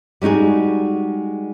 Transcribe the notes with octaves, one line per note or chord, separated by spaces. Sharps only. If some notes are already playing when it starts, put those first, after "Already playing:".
G3 G#3 D#4 F#4 G#4